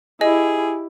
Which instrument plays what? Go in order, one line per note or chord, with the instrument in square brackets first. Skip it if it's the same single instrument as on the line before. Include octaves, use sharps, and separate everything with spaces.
[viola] E4 G4 [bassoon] G#4 [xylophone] D#5